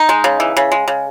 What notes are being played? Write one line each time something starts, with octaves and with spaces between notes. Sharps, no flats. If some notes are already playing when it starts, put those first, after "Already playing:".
Already playing: D#4
G#3
C#3
E3
C#3
G#3
C#3